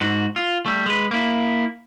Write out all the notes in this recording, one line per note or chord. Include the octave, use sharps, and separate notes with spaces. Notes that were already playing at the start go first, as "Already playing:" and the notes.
G#2 F#4
F4
G3 A3
G#3 B4
A#3 E4